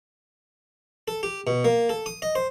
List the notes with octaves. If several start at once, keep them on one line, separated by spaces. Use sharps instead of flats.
A4
G4
B2
A#3
A4
D#6
D#5
C5